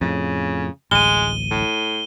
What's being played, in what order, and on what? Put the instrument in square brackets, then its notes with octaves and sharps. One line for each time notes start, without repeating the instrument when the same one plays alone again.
[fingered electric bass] F2 A2 [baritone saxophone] C#3
[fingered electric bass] D1 A1 [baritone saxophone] G#3 [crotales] D#7 G7
[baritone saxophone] A2